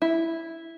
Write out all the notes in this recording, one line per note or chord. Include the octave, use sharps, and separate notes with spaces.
E4